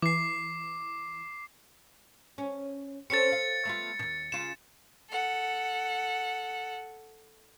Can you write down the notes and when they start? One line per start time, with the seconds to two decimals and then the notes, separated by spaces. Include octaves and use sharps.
0.02 E3 D6 C7
2.38 C#4
3.10 C4 C#4 A4 A6 C#7
3.32 F5
3.65 A3 B3 F4
3.99 D#2 B2
4.32 C#3 F4 E7
5.10 A4 F#5